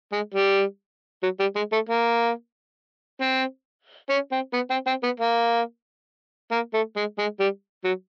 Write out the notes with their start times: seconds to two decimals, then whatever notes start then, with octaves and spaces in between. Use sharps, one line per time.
0.12 G#3
0.34 G3
1.23 F#3
1.40 G3
1.56 G#3
1.72 A3
1.89 A#3
3.21 C4
4.10 C#4
4.32 C4
4.54 B3
4.71 C4
4.87 C4
5.03 B3
5.20 A#3
6.52 A#3
6.74 A3
6.96 G#3
7.19 G#3
7.40 G3
7.85 F#3